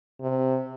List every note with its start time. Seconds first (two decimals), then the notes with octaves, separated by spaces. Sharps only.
0.21 C3